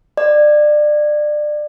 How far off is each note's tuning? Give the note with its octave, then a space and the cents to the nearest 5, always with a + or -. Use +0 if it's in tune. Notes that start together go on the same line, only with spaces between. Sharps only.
D5 +25